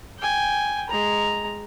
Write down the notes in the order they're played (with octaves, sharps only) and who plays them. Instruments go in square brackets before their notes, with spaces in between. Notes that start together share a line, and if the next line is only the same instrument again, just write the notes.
[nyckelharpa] G5 G#5
G#3 A#5